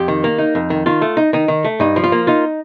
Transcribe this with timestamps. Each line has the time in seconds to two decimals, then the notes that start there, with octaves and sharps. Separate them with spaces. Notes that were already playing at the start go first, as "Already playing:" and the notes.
Already playing: F2 G4
0.08 D#3
0.24 A#3
0.39 D#4
0.55 F2
0.70 D#3
0.86 D#3 F4
1.02 A3
1.17 D#4
1.33 D#3 D#4
1.48 D#3
1.64 A3
1.80 G2 D#4
1.96 F3
2.04 F4
2.12 A#3
2.27 D#4 F4